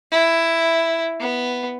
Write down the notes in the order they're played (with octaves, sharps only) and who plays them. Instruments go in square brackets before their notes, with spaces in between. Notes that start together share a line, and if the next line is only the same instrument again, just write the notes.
[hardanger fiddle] E4
B3